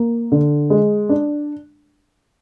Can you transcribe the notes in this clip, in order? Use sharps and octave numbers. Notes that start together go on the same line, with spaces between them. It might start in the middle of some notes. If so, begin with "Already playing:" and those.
Already playing: A#3
D3
G#3
D4